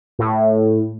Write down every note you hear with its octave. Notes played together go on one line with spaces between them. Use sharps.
A2